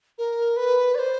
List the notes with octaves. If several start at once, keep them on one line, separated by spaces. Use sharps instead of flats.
A#4
B4
D5
C5